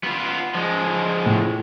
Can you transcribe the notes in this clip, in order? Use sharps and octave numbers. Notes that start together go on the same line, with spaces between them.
B3 F4
F3 G#3
A2